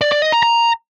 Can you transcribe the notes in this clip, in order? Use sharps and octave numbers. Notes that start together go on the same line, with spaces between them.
D5
D5
D#5
A#5
A#5